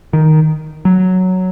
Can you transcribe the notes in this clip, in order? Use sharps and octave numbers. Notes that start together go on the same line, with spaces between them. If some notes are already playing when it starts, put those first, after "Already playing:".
D#3
F#3